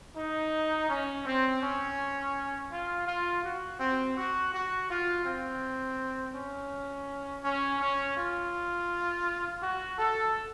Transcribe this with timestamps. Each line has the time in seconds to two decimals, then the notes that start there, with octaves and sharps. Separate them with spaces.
0.16 D#4
0.90 C#4
1.26 C4
1.62 C#4
2.70 F4
3.08 F4
3.45 F#4
3.80 C4
4.17 F#4
4.53 F#4
4.90 F4
5.25 C4
6.35 C#4
7.44 C#4
7.80 C#4
8.17 F4
9.63 F#4
9.99 A4